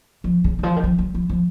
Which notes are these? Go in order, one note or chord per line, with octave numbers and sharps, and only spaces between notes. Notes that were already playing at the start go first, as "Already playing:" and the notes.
F3
C#3
D#3
F3
D#3
F3
F#3
F3
F3